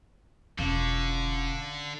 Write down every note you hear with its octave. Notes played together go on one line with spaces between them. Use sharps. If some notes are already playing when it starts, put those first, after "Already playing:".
E1 D3 C#4 F4 F5